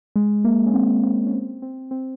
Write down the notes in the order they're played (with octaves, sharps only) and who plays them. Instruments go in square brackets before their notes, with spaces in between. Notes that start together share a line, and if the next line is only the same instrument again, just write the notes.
[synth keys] G#3
A#3
C#4
C4
C4
C#4
C4
C4
C4